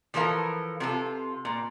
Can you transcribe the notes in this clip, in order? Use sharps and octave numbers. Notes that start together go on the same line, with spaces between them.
E3 F3 A4 A#4 F5
C3 F4 A4
A#2